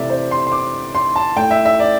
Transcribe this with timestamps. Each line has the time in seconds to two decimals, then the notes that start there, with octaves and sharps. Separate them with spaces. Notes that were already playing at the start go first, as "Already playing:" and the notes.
Already playing: C3 E3 A3 D5 E5
0.10 C5
0.31 C6
0.47 C6
0.52 D6
0.95 C6
1.16 A5
1.36 A2 A3 G5
1.51 E5
1.65 E5
1.80 D5